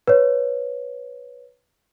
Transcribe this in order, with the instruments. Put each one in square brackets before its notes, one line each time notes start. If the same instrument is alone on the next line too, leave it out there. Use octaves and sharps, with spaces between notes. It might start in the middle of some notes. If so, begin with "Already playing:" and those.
[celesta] B4 C#5